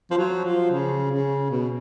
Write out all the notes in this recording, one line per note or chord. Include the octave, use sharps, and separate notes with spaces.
F3
F#3
F3
C#3
C#3
B2